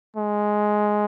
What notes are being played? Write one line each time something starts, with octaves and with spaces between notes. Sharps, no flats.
G#3